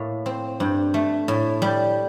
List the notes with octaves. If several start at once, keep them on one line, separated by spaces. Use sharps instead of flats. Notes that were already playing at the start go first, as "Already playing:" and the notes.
Already playing: A2 A#3
C4
G2
A3
A2
G3